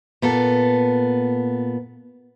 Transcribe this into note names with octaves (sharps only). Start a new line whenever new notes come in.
A#2 B3 A4